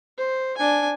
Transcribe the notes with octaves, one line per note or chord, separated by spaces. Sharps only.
C5
D4 G#5